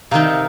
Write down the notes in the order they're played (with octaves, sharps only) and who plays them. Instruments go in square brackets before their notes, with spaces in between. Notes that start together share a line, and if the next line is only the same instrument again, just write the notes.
[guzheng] C3 D#3 C4 [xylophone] F5 A#5